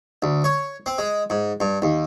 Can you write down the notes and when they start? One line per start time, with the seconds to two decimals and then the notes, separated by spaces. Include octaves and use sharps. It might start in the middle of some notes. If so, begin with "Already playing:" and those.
0.22 D2
0.44 C#5
0.86 C4
0.98 G#3
1.30 G#2
1.60 G2
1.82 D#2